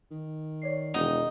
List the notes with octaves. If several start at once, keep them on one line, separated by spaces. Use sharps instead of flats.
D#3
C#5 D5 C7
E1 D#4 F#5